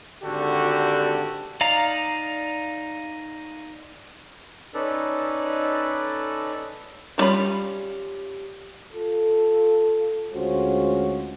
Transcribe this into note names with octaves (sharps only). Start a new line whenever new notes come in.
G#1 D3 D4 F#4 G4 A4
D#4 D5 F5 A#5
C#4 D#4 A4 B4 D5
E3 G3 C#4 F4 B5
F4 A4
D2 G#3 C#4 F4 F#4 C5